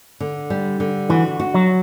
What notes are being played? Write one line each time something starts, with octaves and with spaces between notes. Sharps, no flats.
D3
G3
D3
E3 F#4
F#4
F#3